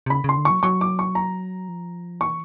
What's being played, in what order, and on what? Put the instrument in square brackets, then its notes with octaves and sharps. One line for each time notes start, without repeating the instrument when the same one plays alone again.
[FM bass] C3
[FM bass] C#3 [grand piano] B5
[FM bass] C#3 [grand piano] C6
[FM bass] D3
[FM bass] F#3 [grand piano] C#6
[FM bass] F#3 [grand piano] C#6
[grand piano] D6
C#6
A#5
[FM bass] F3
[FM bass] E3 [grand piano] C#6